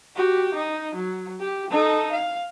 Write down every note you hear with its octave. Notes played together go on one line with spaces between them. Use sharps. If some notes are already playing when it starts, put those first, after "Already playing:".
F#4 G4
D#4
F#3
G4
D#4 A4
F5